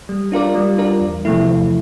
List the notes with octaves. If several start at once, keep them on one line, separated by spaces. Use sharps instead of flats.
G3
D4 F4 A#4 D5
G3
D4 F4 A#4 D5
E2
C3 F3 A3 E4
E2